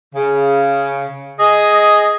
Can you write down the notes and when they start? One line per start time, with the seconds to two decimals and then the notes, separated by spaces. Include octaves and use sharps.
0.14 C#3
1.39 G#4 D#5